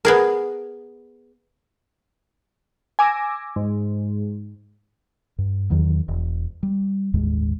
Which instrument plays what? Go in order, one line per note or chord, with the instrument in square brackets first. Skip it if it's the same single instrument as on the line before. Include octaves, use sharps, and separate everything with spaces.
[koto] B3 G#4 A#4
[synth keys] G#5 D6 E6 A#6
G#2
[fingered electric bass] G2
E2 D#3 F#3
E1
G3
G1 D#2 A2 G#3